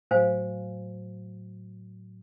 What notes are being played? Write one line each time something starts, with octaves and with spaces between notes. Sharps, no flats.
A2 F#3 C5 F5 G#5